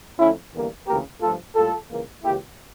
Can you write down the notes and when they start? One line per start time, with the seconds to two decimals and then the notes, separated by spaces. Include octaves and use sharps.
0.19 F2 D3 A3 C#4 E4
0.54 E2 D3 G3 A#3
0.87 D2 C#3 E3 A#3 G4 A#4
1.21 G2 F3 A3 F4 A4
1.55 A2 G3 A#3 F4 A4
1.89 C#2 C#3 E3 A#3
2.23 C#2 C#3 E3 A#3 E4 G4